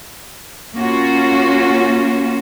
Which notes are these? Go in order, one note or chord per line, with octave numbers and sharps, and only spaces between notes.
A#3 C#4 F4 F#4